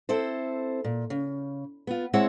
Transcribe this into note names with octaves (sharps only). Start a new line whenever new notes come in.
C4 E4 A4 C5
A#2
C#3
B3 F4
G#3 C4 E4 C#5 F#5